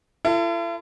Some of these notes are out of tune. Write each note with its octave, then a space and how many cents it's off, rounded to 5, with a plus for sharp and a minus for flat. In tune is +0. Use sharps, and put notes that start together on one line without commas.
E4 +45 A4 +30